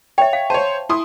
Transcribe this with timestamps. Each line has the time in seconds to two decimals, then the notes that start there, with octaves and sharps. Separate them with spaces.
0.18 C#5 E5 G5
0.33 F5
0.50 C5 C#5 A5
0.89 E4 C6 D#6